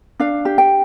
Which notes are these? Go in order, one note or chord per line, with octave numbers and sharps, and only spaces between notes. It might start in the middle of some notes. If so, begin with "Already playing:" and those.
D4 F5
G4
G5